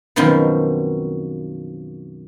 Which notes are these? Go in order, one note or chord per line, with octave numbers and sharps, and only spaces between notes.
F#2 B2 D#3 F3 C4